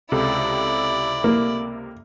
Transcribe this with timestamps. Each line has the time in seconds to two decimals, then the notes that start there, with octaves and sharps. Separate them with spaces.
0.12 C#2 C3 E4 A4 D5
1.24 A#3